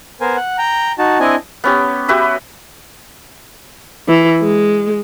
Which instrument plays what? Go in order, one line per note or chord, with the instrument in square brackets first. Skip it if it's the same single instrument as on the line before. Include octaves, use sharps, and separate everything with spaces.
[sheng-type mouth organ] B3 A#4 C5 G#5
F#5
G5 A#5
D#4 F#4 A5
C4 D4 E4 D#5 G#5
[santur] B3 C#4 G4
F#4 G4 B4 E5
[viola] E3
G#3